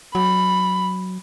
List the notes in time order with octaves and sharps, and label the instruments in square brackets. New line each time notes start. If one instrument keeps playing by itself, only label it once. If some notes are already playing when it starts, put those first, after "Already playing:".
[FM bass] F#3 [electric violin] B5